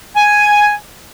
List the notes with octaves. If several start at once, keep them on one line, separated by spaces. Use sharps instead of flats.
G#5